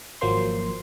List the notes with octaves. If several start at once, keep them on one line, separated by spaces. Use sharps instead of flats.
G#1 F3 F#3 A#3 C5 C6